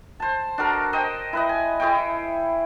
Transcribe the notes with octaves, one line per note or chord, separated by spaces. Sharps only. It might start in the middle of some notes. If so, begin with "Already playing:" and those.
C5 A5
D4 F#4 A4 A#4
C5 D#5 G5
E4 B4 D#5
G#5
E4 G#4 C#5 G5